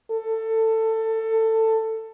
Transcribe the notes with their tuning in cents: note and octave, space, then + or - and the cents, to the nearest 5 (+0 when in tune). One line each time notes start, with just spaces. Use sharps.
A4 +20